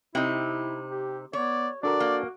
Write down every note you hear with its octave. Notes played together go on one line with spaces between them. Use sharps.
C3 D#4 E4 G5
G4
B3 C#5 D5
D4 F#4 A4 A#4 D5
A#3